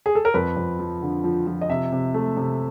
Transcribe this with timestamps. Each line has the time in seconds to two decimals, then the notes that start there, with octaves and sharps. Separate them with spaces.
0.06 G#4
0.15 A4
0.25 A#4
0.34 F2 B4
0.57 F2
0.79 F3
1.02 D3
1.24 F3
1.47 F3
1.61 D#5
1.69 C3 E5
1.92 C3
2.14 A3
2.37 C3